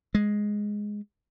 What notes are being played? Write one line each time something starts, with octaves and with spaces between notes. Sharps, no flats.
G#3